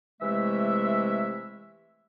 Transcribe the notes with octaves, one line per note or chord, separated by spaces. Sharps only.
C3 E3 G#3 A3 E5